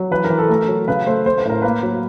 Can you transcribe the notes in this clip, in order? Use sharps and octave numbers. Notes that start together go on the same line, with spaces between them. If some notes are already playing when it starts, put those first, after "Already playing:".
Already playing: F#3
E3 B4
A#4
E3
A4
A3 A#4
F#3
C#3 B4
A3 C5
A3 C5
B4
A2 A#4
A#3 B4
F#3